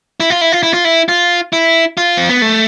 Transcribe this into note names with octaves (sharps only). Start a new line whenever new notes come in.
E4
F4
E4
F4
E4
F4
E4
F4
E4
F4
C4
B3
A3